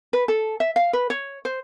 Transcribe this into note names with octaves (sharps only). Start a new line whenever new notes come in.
B4
A4
E5
F5
B4
C#5
C5